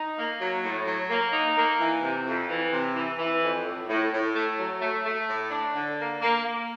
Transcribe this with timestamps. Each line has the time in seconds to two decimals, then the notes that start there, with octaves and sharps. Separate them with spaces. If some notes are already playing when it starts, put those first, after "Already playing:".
Already playing: D#4
0.17 A#3
0.40 F#3
0.63 A2
0.86 F#3
1.09 A#3
1.32 D#4
1.56 A#3
1.79 E3
2.02 C3
2.26 F2
2.49 E3
2.72 C3
2.95 E3
3.19 E3
3.42 F2
3.65 A2
3.88 A2
4.12 A2
4.35 A3
4.58 F#3
4.81 A3
5.05 A3
5.28 A2
5.51 D4
5.74 D3
5.98 A#3
6.21 A#3
6.44 A#3